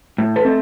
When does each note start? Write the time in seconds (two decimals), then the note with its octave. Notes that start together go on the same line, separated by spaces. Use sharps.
0.18 A2
0.36 A4 B4
0.45 A3 C4